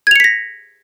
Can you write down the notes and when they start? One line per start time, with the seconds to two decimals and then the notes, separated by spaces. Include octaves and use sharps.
0.07 G#6
0.11 F7
0.16 C#7
0.20 B6
0.24 A#6